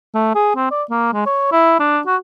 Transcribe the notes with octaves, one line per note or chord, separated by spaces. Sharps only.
A3
G#4
C4
D5
A#3
G#3
C#5
E4
D4
F#4